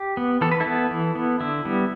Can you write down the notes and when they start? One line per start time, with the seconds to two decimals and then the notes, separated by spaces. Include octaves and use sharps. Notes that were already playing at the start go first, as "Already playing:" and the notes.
Already playing: G4
0.17 B3
0.41 E3 A4
0.51 B4
0.60 E4 A4
0.66 B3
0.91 E3
1.15 B3
1.40 D3 E4
1.65 G3 B3